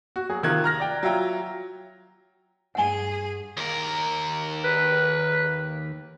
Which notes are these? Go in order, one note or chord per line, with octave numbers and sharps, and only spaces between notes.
F#4
F#3 G#4
C3 D#3 F4 F#6 G#6
A#5 F6 A#6
D5 G5
F#3 F4 E5 G5 A#5
G2 G#4 F#5 G#5
D#2 A#4
B4